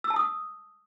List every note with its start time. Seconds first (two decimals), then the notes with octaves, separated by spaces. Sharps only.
0.04 E6
0.10 A5
0.16 D#6